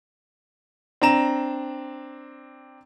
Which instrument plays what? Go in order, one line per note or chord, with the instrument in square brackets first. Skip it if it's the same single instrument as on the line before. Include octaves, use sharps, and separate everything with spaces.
[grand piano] C4 D4 A#5 E7